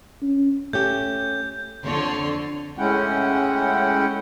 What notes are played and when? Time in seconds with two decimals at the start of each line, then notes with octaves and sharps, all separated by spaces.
0.22 C#4
0.73 A3 C#4 G4 G6
1.84 F2 D3 C#5 D5 C6
2.78 A2 G#3 C#4 E4 F#5 G5